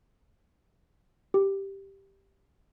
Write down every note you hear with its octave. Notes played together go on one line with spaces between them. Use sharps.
G4